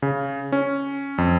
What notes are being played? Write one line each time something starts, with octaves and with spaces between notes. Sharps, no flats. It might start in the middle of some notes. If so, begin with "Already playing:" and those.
C#3
C#4
F2